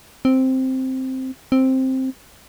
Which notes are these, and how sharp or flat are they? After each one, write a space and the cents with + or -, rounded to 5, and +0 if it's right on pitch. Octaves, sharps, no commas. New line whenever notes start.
C4 +0
C4 +5